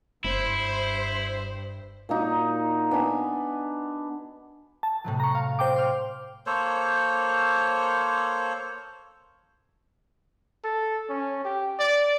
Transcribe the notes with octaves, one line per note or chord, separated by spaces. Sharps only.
F#1 G2 E4 C5
A#2 A#3 D#4 F#4
B3 D4 G#5 B5
A5
A2 C3 F#3
A#5 C#6
F5
C5 G5 D6
C6 F6
A#3 A4 C5 C#5
A4
C#4
G4
D5